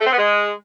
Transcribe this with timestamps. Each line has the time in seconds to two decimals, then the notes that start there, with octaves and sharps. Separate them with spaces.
0.01 A3
0.07 C4
0.13 B3
0.18 G#3